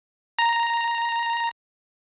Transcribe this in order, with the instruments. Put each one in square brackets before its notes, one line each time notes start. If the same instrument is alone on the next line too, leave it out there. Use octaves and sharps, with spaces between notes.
[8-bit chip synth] A#5